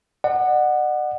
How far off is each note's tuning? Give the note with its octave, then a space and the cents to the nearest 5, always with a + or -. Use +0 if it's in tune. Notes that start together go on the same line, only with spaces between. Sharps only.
D5 +45 F#5 +0